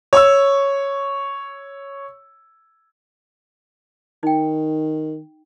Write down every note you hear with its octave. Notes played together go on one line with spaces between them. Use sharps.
C#5 C#6 E6
D#3 D#4 G5